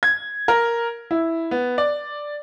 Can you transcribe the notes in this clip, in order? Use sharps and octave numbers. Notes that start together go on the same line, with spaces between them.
G#6
A#4
E4
B3
D5